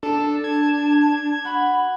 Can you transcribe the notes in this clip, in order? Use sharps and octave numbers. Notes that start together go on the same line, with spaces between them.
D4 A4 A5
G#6
F#4 B5